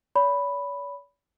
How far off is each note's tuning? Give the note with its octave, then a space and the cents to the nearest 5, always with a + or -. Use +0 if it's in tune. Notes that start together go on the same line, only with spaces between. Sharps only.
C#5 +45 B5 +0